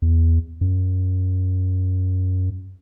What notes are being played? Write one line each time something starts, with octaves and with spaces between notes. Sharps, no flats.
E2
F#2